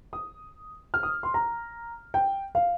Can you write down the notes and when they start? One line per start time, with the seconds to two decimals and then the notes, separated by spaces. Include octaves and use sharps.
0.13 D#6
0.94 F6
1.03 D#6
1.23 C6
1.34 A#5
2.14 G5
2.55 F5